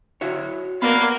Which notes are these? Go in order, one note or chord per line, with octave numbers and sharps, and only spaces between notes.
E4 F#4 C#5
A#3 B3 F#4 B4 C#5 D5 F5 B5